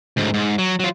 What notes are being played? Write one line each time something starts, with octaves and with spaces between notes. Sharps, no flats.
D2 G#2
G#2
F#3
F#3 F4